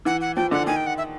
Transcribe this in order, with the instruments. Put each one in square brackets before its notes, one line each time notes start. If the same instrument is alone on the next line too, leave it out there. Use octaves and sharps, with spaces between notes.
[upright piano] E3 [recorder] F#5
[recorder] F#5
[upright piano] F3 [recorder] G5
[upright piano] D3 [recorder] F#5
[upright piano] D#3 [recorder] G#5
[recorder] G5
F#5
E5